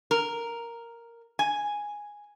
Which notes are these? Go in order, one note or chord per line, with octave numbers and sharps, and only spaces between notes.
A#4
G#5